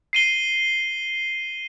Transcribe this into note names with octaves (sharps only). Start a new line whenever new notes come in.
C7 D#7 G7